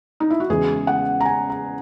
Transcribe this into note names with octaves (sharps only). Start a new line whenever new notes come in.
D#4
E4
F#4
E2 C#3 E3 G#3 G#4
F#5
A#5
G#5
A#5